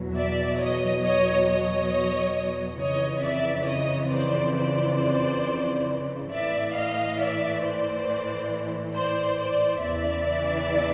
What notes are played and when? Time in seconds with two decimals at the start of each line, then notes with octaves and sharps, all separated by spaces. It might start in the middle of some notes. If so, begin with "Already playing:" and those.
Already playing: E2 B2 F#3
0.15 D5 E5
0.60 C#5 D#5
1.03 C#5 D#5
1.47 C#5 D#5
2.78 F2 C#3 E3 C#5 D#5
3.22 D5 E5
3.66 C#5 D#5
4.10 C5 D5
4.54 C5 D5
6.30 A2 E3 D5 E5
6.74 D#5 F5
7.18 D5 E5
7.61 C5 D5
8.93 C5 D5
9.37 C5 D5
9.80 E2 C#3 E3 D5 E5